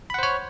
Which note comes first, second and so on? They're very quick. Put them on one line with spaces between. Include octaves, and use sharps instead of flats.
B5 F#5 C5 C#5